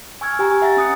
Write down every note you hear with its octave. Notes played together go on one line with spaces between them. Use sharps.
G#5 C#6 E6 F6 G#6
G4 G#5 A#5
E5 F#5 A#5 A6 A#6
C#4 D#6 F#6 C#7